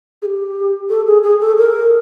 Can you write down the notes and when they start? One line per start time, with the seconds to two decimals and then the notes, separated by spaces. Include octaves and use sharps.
0.22 G#4
0.25 G4
0.89 A4
1.07 G#4
1.23 G#4
1.40 A4
1.58 A#4